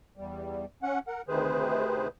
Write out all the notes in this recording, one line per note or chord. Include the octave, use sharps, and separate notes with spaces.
E2 G3
C#4 F#5
A#4 F#5
D2 C3 D#3 G#4 B4 C5